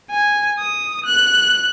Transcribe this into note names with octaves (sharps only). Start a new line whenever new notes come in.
G#5
D#6
F#6